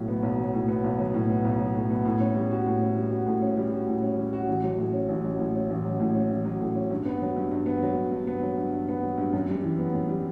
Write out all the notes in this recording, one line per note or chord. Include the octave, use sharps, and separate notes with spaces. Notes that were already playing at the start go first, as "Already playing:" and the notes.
Already playing: B1 A2 F#3
B3
B1
F#3
A2
B3
B1
F#3
A2
B3
B1
F#3
A2
B3
A2
C#4
G3
F#4
A2
C#4
G3
F#4
A2
C#4
G3
F#4
A2
C#4
G3
F#4
A1
F#3
A2
C#4
A1
F#3
A2
C#4
A1
F#3
A2
C#4
A1
F#3
A2
C#4
G2
B3
F#3
G2
G2
B3
F#3
G2
G2
B3
F#3
G2
G2
B3
F#3
G2
F#2
G3
E3
B3
F#2
G3